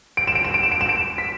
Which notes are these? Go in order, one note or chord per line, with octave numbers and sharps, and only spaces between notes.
D7
E7
D7
E7
D7
E7
D7
E7
D7
B6